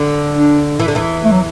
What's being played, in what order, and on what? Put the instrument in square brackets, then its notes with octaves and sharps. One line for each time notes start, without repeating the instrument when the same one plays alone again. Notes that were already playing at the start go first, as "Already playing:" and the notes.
Already playing: [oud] D3
[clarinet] D4
[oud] E3
D3
E2 E3
[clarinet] A3
F#3